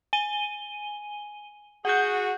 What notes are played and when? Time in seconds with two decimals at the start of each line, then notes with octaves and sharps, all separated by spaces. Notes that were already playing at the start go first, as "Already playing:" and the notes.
0.13 G#5 D#7 G7
1.85 F#4 G#4 F#5 G6